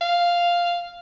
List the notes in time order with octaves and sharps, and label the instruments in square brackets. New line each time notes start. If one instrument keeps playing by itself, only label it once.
[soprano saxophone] F5